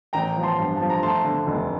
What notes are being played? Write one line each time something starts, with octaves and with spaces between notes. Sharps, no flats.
A1 G5 A#5
F3
A5 C6
G2
F3 A5
A#5
A3 A5 C6
D3
F1